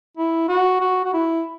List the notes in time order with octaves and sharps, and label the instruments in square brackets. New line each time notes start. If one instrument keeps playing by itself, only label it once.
[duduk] E4
F#4
F#4
F#4
E4